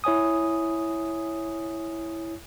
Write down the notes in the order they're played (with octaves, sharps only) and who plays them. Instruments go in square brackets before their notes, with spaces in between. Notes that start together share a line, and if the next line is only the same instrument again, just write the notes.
[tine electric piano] E4 C#5 G#5 D#6